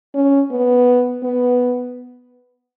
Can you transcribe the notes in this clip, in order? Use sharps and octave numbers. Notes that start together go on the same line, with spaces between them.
C#4
B3
B3